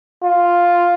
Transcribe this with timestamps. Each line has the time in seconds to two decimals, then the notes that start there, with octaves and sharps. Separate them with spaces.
0.24 F4